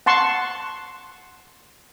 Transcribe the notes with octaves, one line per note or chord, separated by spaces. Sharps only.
F#5 A5 C6 C#6